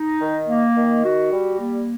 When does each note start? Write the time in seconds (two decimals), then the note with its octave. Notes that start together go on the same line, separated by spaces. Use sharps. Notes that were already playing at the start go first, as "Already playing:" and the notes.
Already playing: D#4
0.21 D#3
0.48 A#3
0.76 D#3
1.03 F#4
1.31 G3
1.59 A#3